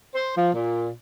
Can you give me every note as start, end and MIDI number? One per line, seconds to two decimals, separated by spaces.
0.14 0.34 72
0.36 0.53 53
0.53 0.88 46